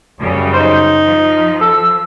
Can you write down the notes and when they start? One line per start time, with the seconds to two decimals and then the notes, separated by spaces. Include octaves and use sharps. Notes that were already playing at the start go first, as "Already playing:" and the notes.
0.19 F#2 C#3 G3
0.54 D#4 C5
1.05 F3
1.61 A4 E6